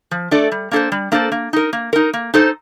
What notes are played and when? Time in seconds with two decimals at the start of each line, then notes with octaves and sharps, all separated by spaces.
0.11 F3
0.31 A3 D4 A4 D5
0.52 G3
0.71 A#3 D4 A4 C5
0.92 G3
1.12 A#3 D4 A4 C5
1.32 A#3
1.53 D#4 A#4
1.73 A#3
1.93 D#4 A#4
2.13 A#3
2.34 D#4 A4 C5